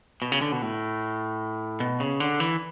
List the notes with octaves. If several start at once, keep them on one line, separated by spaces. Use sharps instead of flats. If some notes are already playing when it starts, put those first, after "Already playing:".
B2
C#3
D3
B2
A2
B2
C#3
D3
E3